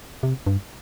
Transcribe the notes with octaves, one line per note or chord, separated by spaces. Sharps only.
C3
G2